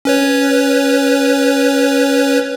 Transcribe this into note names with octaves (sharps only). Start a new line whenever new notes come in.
C#4 B4 C#5